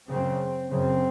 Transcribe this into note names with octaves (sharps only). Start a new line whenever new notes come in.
F#2 C#3 C4
F#2 C#3 C4